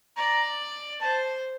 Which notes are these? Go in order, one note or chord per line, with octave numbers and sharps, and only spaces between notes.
D5 A#5
C5 A5